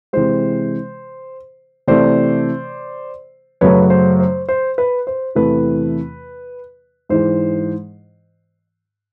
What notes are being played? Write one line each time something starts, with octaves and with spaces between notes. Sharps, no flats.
C3 E3 G#3 C5
C3 E3 A3 C5 D5
F#2 C#3 F#3 A3 B4 C#5
C5
C5
C5
B4
C5
E2 C3 E3 A3 B4
G#2 E3 G#3 C5